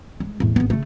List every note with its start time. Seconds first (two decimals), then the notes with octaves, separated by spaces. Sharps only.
0.20 G#3
0.40 E2 A2
0.56 G#1 B3
0.70 C#3 A3